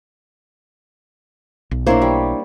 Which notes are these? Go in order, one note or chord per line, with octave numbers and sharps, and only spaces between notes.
B1
A#3 D4 E4 C5 C#5
G3